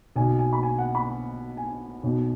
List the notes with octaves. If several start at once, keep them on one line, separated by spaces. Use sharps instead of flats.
B1 B2 G#5
G#5
B5
G#5
F#5
B5
G#5
B1 B2